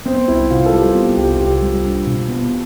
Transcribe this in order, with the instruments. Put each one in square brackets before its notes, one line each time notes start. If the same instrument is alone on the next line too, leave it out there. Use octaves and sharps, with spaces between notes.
[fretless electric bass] B3 [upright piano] C4
[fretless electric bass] C2 [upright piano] E4
[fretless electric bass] C3 [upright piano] F4
[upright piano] A4
[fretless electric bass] G3 [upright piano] G4
[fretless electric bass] B3 [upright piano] F4
[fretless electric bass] C2 [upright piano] G4
[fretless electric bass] C2 [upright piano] G4
[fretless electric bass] G3 [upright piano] F4
[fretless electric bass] D4
B2
B3